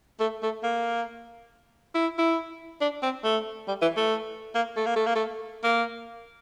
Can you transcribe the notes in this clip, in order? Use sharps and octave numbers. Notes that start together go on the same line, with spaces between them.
A3
A3
A#3
E4
E4
D4
C4
A3
G3
E3
A3
A#3
A3
A#3
A3
A#3
A3
A#3